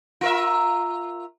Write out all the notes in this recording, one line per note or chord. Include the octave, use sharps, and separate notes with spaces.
F4 A#4 E5